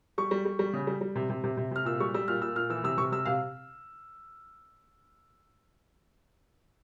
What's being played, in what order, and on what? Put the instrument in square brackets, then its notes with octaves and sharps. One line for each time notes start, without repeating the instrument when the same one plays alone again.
[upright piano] G3 C#6
G3
G3
G3
C#3
G3
G3
C3
C3
C3
C3
C3 F6
A#2 E6
G3 C#6
G3 E6
A#2 F6
A#2 E6
A#2 F6
E3 E6
C3 E6
C3 C#6
C3 E6
C3 F5